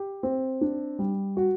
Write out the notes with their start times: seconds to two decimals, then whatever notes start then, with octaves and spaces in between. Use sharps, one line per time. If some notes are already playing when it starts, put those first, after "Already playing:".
Already playing: G4
0.23 C4
0.61 D4
0.99 G3
1.37 F#4